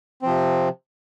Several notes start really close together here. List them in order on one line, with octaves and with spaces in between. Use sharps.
C4 F3 C3